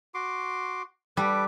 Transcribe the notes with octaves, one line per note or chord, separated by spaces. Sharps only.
F#4 C6 D6
G3 A4 B4 D6